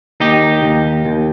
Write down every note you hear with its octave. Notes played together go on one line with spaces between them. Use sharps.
D#2 D#4 G4
D#2
D#2